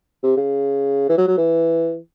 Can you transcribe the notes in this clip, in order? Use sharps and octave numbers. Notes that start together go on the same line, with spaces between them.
C3
C#3
E3
F#3
F#3
E3